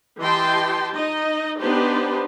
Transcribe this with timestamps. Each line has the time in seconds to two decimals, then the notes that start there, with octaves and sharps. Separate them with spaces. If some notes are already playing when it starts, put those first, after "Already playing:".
0.20 E3 G4 D#5 G5 A5 C6
0.94 D#4 D#5
1.61 B3 D4 D#4 G4 B4 C5